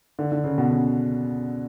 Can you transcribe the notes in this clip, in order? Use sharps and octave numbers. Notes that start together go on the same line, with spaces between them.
D3
D3
C#3
B2
C#3